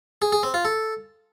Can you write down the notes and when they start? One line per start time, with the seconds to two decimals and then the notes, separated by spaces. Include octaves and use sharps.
0.22 G#4
0.33 G#4
0.43 C4
0.54 F4
0.65 A4